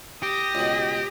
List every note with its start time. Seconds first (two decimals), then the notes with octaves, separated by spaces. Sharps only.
0.22 G4 D#6 A#6
0.55 C#2 B2